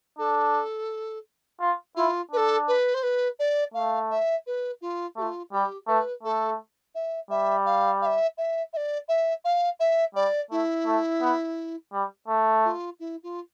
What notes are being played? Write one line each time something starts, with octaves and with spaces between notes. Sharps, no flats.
D4 A4
F4
E4 F4
D4 A4 B4
B4
C5
B4
D5
A3 F5
E5
B4
F4
A3 F4 G4
G3 G4
A3 B4
A3 A4
E5
G3 E5
F5
F5
E5
E5
E5
D5
E5
F5
E5
G3 D5
A3 E4
A3
B3
G3
A3
F4
E4
F4